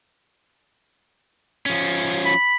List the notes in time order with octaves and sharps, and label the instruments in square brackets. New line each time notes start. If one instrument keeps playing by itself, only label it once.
[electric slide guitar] F3 C#4
[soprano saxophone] B5